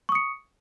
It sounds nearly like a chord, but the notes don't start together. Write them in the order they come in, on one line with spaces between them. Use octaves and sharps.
C#6 D#6 C#7